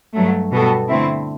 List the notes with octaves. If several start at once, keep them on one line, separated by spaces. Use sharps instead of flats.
G2 F#3 A3
B2 G3 B3 F#4 A4
D3 A3 C4 E4